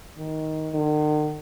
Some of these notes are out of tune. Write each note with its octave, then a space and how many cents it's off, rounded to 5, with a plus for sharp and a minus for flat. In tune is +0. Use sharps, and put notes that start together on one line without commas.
D#3 +10
D#3 -45